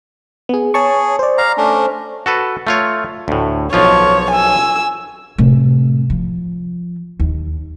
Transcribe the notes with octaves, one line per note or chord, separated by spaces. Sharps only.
B3 G#4
G#4 C#5 A5 C#6
C5 D5
F5 A#5
A3 C#4 D4
F#4 A4 B4
A3 F4 C#5
D2 A2
B1 F3 F4 C#5
G#5 E6
A2 C3
F3
D#2